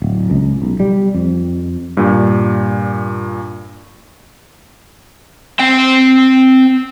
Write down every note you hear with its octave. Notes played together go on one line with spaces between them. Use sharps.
D1
C#2
B1
G3
F2
G2 A#2
C4 G5